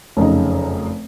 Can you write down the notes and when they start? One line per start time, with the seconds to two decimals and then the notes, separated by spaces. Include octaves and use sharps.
0.17 F1 F#2 C#3 D#4